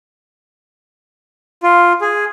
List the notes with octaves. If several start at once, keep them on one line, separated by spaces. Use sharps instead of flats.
F4
G#4